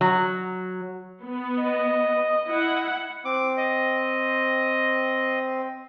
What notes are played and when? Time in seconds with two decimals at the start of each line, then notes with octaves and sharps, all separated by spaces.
0.01 F#3
1.23 B3
1.62 D#5
2.48 E4 F#5
3.25 C4 D6
3.57 D#5